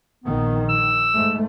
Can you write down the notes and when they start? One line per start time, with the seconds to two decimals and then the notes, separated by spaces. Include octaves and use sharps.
0.24 A#1 D#3 B3
0.69 E6
1.13 G#2 A3